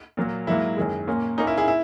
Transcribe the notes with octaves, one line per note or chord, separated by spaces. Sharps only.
A#2 F#3 A#3
G#2 F#3 A#3 E4
F#2 D#3 G#3
A#2 A#3 C#4
A#2 A#3 C#4 D#4
E4
E4 G#4
E4